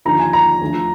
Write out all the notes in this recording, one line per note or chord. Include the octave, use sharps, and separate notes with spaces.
D#2 D3 F3 A#5
G#5
A#5
D2 D3 F3